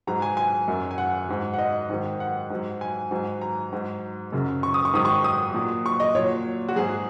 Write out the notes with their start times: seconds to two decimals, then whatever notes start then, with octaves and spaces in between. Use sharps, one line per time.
0.07 G#2 F#3 A#5
0.22 G#5
0.37 G#5
0.68 F#2 F#3
0.91 G#5
0.98 F#5
1.28 G#2 F#3
1.54 F#5
1.59 D#5
1.90 G#2 D#3 F#3
2.20 F#5
2.50 G#2 F#3
2.81 G#5
3.11 G#2 F#3
3.42 A#5
3.72 G#2 F#3
4.32 F#2 C#3 F#3
4.63 C#6
4.74 D#6
4.85 C#6
4.94 G#2 D#3 F#3 D#6
5.05 C#6
5.24 D#6
5.54 A#2 F#3
5.86 C#6
6.00 D#5
6.15 A#2 F#3 C#5
6.68 F#4
6.76 G#2 F#3 G#4